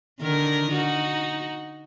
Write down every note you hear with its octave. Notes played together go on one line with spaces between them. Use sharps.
D3 D#3 A#4
D#4 F#4